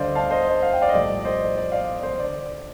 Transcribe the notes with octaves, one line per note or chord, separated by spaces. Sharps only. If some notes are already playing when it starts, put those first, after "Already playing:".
Already playing: D2 D3 G3 C5 D5 D#5 F5
F5 A5
C5 D#5
F5
G5
D5 F5
D#5
A#1 A2 G3 D5
D5
C5 D#5
D5
D5 F5
C5
D3 D5